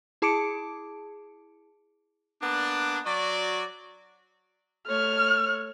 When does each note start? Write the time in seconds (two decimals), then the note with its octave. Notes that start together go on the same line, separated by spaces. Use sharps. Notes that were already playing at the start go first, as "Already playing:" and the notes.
0.22 E4 G#4 A5 D6 C#7 D7
2.42 A#3 B3 D4
3.07 F#3 F#4 D5
4.87 A3 C#5 F6